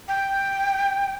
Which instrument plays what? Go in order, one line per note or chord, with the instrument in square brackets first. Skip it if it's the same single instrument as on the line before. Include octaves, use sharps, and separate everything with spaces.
[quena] G5